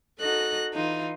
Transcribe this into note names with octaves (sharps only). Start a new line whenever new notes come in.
D#4 F#4 A4 F#6 A#6
E3 D#4 F4